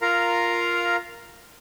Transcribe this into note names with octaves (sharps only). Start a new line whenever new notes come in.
F4 A#4 F5 A#5